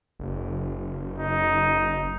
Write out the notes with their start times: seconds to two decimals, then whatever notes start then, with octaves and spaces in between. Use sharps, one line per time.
0.19 F#1
1.18 D#4